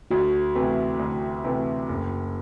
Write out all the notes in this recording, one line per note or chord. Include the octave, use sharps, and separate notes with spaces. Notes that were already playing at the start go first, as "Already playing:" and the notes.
D2 F#4
C3 E3 A3
D2
C3 E3 A3
F#1